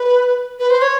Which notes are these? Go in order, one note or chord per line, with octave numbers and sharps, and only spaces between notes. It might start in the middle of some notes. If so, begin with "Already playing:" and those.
Already playing: B4
B4
C5
C#5